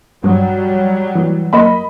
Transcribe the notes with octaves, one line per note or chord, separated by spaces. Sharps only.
G2 F#3 G3
E3
F#2 A#3 D#5 B5